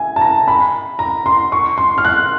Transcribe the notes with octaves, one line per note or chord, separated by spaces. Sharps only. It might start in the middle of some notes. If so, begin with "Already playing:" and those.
Already playing: E5 G#5
A5
A#5
B5
A#5
C6
C#6
C6
F6
F#6